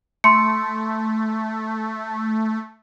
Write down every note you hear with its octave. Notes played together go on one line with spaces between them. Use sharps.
A3 C6 C#7